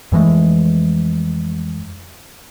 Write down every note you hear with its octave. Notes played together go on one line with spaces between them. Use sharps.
F2 E3 G#3 A3